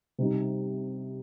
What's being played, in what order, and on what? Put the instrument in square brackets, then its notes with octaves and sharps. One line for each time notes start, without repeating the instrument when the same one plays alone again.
[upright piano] C3 G3 D#4